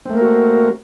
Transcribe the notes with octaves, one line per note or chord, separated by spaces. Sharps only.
A3 A#3 C4 F#4 A#4